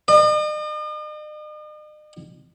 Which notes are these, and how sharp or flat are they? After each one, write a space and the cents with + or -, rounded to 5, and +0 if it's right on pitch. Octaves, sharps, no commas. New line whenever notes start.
D#5 -45